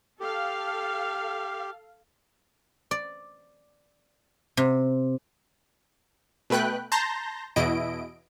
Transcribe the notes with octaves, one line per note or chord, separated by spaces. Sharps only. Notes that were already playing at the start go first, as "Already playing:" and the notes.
G4 A4 F5
D5
C3
B2 A3 B4 G5 F#6
A5 A#5 C6 G6 A#6
E2 B2 E4 D#5 D7